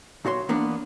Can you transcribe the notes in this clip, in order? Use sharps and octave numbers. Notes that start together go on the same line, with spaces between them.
B1 F#4 C#5 C6
E3 A#3 B3 D4